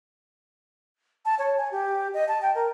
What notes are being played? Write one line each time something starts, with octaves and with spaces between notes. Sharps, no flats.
A5
C#5
G#5
G4
D#5
A5
G5
A#4